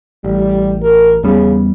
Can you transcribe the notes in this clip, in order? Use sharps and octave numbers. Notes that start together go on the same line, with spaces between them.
A1 G3
A#4
E2 C#3 G3 B3